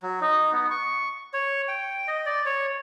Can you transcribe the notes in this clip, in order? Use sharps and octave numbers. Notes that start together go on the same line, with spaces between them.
F#3
D#4
B3
C#6
C#5
G5
D#5
D5
C#5